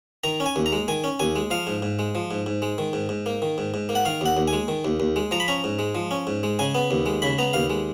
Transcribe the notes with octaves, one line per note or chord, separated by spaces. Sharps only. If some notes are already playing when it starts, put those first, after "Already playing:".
D#3 A#5
C#4
G#5
D#2
A#5
G#3
D#3 G#5
C#4
D#2 G#5
G#3
F3 F5
G#2
G#2
G#3
F3
G#2
G#2
G#3
D#3
G#2
G#2
A#3
D#3
G#2
G#2
A#3
F#5
D#3 F5
D#2 F#5
D#2
G#5
G#3
D#3
D#2
D#2
G#3
F3 A#5
B5
C#4 A#5
G#2
G#3
F3
C#4
G#2
G#3
C#3 G#5
B3
D#2
G#3
C#3 B5
B3 A#5
D#2 F5
G#3